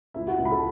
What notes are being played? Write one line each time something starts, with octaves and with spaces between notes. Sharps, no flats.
C#2 E4 E5
F#4 F#5
C#2
B5
A4 A5